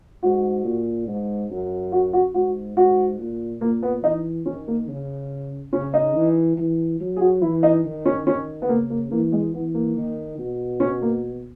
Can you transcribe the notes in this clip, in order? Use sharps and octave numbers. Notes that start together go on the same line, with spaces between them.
G#2 F#4
A#2
G#2
F#2
F#4
F#4
G#2 F#4
G#2 F#4
A#2
A#2 A#3
B3
E3 D#4
D#3 C#4
A#3
C#3
C#3 C#4
D#4
E3
E3
F#3
G#4
F#4
E3 E4
D#4
D#3
C#4
D#3 C#4
B3
C#3 A#3
A#3
E3 A#3
G#3
E3 B3
A#3
D#3
B2
C#4
A#3